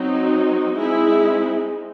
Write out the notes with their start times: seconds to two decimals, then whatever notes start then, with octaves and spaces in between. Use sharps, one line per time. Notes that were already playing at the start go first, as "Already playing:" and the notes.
Already playing: F#3 C4 D#4
0.75 G#3 C4 D#4 E4 G#4